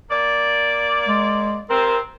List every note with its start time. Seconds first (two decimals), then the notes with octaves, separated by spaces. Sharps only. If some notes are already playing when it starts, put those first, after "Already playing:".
0.09 A#3 D5
1.08 G#3
1.70 C3 C4 A#4